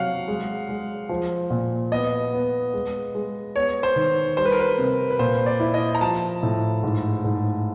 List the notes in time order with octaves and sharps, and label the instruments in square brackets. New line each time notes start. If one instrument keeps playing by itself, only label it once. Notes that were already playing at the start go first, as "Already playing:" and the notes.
Already playing: [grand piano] C3 F#3 [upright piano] F5 F#5
[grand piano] G#3
G#3
F3
A#2
[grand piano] B3 [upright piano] D#5
[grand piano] B3
G#3
G#3
[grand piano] B3 [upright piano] C#5
[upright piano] C5
[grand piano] D#3
[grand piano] G3 [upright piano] C5
[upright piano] B4
A#4
B4
[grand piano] C3
[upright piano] B4
[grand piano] A#2 [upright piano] C5
[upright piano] D5
[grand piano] E4
[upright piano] D#5
A#5
[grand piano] F3 [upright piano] A5
[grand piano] A2
G#2
G#2